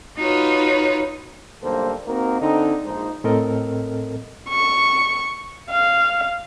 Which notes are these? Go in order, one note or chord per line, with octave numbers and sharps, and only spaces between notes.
D#4 F4 F#4 B4 C#5
B1 D3 G3 A#3 A4 C5
A#3 C4 D#4 F#4 A#4
D3 C4 D#4
A#1 G#3 D#4 C5
A2 C4 A4 A#4 D#5
C#6
F5